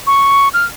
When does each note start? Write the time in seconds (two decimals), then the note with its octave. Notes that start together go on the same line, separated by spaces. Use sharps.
0.07 C#6
0.54 F6